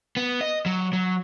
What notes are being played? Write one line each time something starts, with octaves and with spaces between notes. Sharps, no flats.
B3
D#5
F#3
F#3